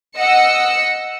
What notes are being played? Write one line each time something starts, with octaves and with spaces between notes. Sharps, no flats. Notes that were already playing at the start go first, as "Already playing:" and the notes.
D#5 F#5 E6 C#7